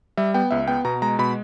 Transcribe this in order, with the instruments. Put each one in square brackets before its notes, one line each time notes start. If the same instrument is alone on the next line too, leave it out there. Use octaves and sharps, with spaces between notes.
[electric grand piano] G3 E5
B3 G5
C#2 E5
B3 G5
B2 A#5
G#3 A#5
B2 B5